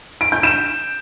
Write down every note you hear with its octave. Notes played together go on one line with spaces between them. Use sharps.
D7
G6
E7